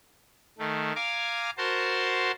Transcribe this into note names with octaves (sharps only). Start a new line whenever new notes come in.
D#3 A3
F5 G#5 A#5 D6
F#4 A#4 C5 A5 C6